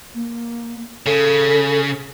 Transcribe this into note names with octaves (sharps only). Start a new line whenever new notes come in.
A#3
C#3 A4